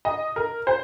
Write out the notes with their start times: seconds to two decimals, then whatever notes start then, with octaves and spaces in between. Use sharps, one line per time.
0.05 D#5
0.36 A#4
0.67 C5